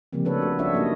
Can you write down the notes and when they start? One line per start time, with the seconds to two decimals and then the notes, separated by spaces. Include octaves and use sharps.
0.13 C#3 F3 G3 A#3 C4
0.25 A3 D4 A4 B4 C#5
0.42 F#4
0.59 C#4 D4 F4 A4 C#5 E5
0.73 F#3 G3 A#3 D#4 D#5